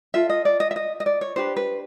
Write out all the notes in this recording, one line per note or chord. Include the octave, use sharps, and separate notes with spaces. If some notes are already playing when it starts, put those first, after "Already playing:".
F4 A4 E5
D#5
D5
D#5
E5
D#5
D#5
D5
C#5
D4 G4 B4 C5
B4